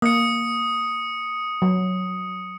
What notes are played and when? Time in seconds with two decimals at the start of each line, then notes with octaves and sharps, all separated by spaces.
0.02 A#3 D#6 C#7
1.62 F#3